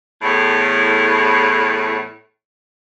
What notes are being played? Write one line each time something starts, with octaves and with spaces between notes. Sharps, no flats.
E2 A2